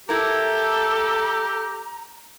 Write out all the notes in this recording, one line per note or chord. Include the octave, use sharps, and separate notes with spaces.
A3 E4 G4 A4 A#4 A#5